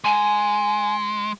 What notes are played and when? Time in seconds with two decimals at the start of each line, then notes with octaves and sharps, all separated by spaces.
0.04 G#3 G#5